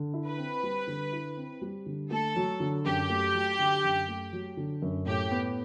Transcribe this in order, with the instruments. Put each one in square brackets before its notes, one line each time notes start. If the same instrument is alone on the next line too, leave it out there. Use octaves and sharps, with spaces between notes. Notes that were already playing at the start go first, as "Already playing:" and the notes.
Already playing: [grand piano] D3
E4
[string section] B4
[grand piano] C4
G3
D3
E4
C4
G3
D3
[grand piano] A3 [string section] A4
[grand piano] F#3
D3
[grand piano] F#2 [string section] G4
[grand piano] A3
F#3
D3
F#2
A3
F#3
D3
F#2
[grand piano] A2 [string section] G4
[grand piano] B3